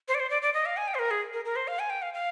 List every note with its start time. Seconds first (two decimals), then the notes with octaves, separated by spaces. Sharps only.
0.08 C5
0.14 D5
0.20 C5
0.30 D5
0.42 D5
0.54 D#5
0.66 F5
0.77 G#5
0.88 G5
0.95 C5
0.99 A#4
1.11 G#4
1.33 A#4
1.45 A#4
1.56 C5
1.68 F5
1.79 G#5
1.90 G5
2.02 F5
2.14 F5